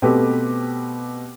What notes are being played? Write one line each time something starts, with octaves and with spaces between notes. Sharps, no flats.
B2 A3 C4 G4 B4